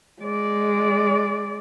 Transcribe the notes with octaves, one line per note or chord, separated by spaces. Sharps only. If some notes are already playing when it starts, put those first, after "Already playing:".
G#3 D5